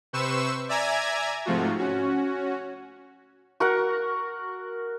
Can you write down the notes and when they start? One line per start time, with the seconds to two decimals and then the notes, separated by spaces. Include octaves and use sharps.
0.13 C3 B4 C5 C#6 E6 E7
0.69 D5 E5 G#5 A#5 G#6
1.46 G#2 C3 F3 A3 F4 F#4
1.79 C#4 F#4
3.60 F#4 A#4 F#5